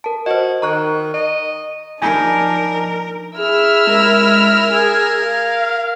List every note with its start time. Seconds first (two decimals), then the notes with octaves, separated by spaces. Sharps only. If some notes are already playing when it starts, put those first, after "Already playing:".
0.04 A#4 A5
0.26 F#4 C5 D#5
0.62 D#3 A#5 C#6 F#6
1.14 D#5
2.02 F3 D4 D#4 A#4 G#5 A#5 G6
3.38 E4 G#4 E6 F6
3.87 G#3 A#4
4.72 G#4 G#6
5.26 F5